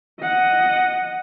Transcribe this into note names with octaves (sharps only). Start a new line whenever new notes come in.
D#5 F#5